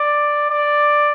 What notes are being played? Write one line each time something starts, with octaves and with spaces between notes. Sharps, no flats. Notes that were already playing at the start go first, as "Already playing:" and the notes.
Already playing: D5
D5